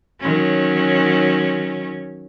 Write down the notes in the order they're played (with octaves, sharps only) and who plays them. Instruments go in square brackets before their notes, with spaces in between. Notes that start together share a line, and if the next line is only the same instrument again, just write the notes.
[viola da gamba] D#3 F#3 C#4